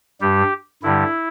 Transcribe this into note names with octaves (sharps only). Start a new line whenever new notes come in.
G2 G3 G4
G2 D3 G3 E4